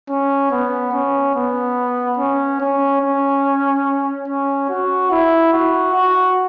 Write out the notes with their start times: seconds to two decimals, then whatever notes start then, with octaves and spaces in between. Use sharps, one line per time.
0.09 C#4
0.51 B3
0.93 C#4
1.35 B3
2.18 C#4
2.60 C#4
3.02 C#4
4.28 C#4
4.69 F#4
5.11 E4
5.53 F#4
5.94 F#4